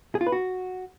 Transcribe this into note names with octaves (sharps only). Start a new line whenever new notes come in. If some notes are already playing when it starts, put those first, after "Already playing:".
G#4
F4
B4
F#4